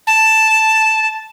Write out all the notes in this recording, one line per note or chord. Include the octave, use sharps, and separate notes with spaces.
A5